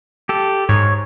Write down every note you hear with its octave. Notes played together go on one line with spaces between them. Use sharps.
G4 A4
G#2 C#5